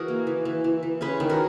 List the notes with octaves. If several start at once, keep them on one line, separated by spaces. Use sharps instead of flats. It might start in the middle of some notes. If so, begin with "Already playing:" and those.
Already playing: E3 F#4 G#4 A#4
A#3
E3
E3
E3
E3
C#4 G#4 B4
D#3
F#4 A#4